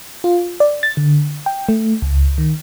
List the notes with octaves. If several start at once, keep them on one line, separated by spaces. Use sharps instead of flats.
F4
D5
A6
D3
G5
A3
C#2
D#3